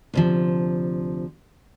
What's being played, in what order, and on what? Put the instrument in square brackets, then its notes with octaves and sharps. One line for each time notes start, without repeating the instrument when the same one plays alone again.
[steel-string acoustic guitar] D2 C3 F3